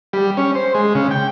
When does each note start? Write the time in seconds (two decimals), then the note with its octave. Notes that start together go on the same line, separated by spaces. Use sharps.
0.13 G3
0.37 C#4
0.55 C5
0.75 G#3
0.95 C#3
1.11 G5